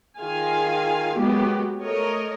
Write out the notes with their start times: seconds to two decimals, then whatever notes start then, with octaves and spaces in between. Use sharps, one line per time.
0.19 D#3 F4 G#4 F5 G#5
1.15 F#3 G#3 A#3 B3 G4
1.79 A3 A#4 C#5 D#5